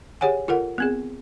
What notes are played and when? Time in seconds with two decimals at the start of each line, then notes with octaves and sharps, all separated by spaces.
0.21 G4 G#4 C#5 F#5 G#5
0.48 F4 A4 A#4 F#5
0.78 B3 C4 G#4